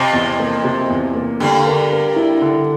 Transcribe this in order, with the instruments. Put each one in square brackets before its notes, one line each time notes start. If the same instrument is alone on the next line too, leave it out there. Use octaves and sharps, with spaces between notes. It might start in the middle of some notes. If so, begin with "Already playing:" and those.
Already playing: [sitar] F2 F3 [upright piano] C3
[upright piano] E2
A#3
C3
E2
A#3
[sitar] G2 G3 [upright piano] D3
[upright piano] A#4
A#4
E4
D3